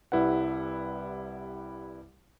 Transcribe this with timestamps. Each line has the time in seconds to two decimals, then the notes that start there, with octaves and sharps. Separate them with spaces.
0.12 C2 G3 E4 B4 F#5